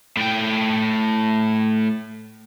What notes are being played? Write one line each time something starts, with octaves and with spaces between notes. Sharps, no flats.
A2 G5